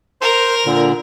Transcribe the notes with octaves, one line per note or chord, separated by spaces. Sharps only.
A#4 C5 C6
A#2 D3